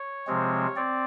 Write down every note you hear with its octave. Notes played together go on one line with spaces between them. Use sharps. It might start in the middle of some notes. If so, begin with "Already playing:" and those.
Already playing: C#5
C3 F3 G#3 C4
C4 D5